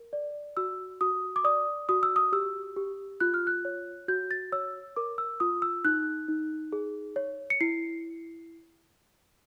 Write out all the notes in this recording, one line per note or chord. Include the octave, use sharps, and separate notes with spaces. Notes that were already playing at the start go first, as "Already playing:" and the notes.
Already playing: A#4
D5
F#4 E6
F#4 D#6
D6
D5 D#6
F#4 D#6
E6
D#6
G4 E6
G4
F4 F#6
F6
F#6
C#5
F#4 G6
A6
C#5 E6
A#4 D6
E6
F4 D#6
E6
D#4 F#6
D#4
G#4
C#5
C#7
E4 C7